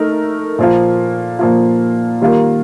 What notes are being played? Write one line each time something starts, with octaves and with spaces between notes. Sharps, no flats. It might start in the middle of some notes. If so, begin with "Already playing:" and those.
Already playing: A3 D#4 A#4
A#2 F3 A#3 F4
A#2 F3 A#3 F4
D#3 G3 A#3 F4 A#4